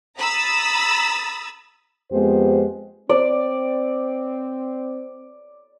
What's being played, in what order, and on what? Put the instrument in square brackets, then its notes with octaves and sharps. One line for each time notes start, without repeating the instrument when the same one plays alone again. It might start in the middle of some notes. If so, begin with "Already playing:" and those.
[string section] A#5 B5 D#6 E6 A6
[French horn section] F2 G#3 B3 G4 C5
[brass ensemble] C4 [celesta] C5 [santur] D5